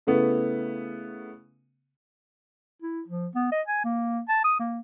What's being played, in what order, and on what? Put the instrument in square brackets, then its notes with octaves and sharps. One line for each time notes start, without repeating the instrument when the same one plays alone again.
[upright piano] C#3 A3 B3 E4
[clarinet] E4
F3
B3
D#5
G#5
A#3
A5
D#6
A#3